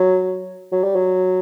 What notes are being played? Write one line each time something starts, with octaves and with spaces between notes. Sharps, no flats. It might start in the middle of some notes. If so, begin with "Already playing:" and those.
Already playing: F#3
F#3
G3
F#3